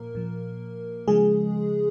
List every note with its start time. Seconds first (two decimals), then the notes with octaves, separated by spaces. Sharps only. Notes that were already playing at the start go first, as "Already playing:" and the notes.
Already playing: A#2 F3 A#3 A#4
0.15 A#2 F3
1.08 C#3 F3 G#3 G#4